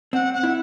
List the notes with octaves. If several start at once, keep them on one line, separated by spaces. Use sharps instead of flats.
C4 F#5
F#5
E4